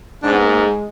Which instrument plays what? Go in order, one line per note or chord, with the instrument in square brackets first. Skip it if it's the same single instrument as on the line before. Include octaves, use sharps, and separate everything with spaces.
[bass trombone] G#2 [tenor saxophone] D4
[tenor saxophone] B3
A#3
A#3
G#3